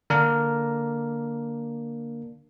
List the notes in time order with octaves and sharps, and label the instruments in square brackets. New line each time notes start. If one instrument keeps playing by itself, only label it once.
[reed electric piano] D3 A#5 F6 [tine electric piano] A#3 D4